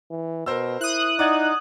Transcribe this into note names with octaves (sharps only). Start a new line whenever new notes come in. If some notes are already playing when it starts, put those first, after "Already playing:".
E3
B2 A#4 C5 E6
E4 D#6 F#6
D#4 D5 F#5 G#6